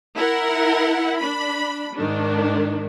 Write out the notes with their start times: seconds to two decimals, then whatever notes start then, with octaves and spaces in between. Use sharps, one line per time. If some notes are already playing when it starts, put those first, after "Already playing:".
0.16 E4 A#4 F#5
1.19 D4 B5
1.96 G#2 D#3 D4